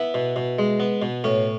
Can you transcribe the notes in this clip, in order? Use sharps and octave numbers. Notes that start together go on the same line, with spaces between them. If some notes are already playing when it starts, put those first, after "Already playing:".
Already playing: B3 E4
B2
B2
G#3
B3
B2
A2 C#4